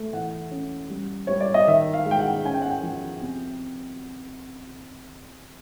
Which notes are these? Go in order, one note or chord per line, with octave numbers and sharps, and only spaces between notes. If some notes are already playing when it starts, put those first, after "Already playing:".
Already playing: A3
E3 F#5
C#4
G3
G3 C#5
D5
D#5
D#3 E5
F5
G#3
G5
F#5
C#4 G#5
G5
F#5
G5
F3
C3